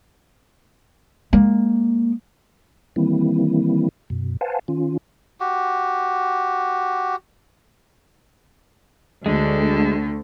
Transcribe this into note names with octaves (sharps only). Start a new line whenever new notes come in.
G#3 A#3
D#3 E3 G3 A#3 C4 E4
F#2 B2
B4 C5 F5 F#5 G#5 A5
D#3 C#4 F4
F#4 G4
D2 D3 G#3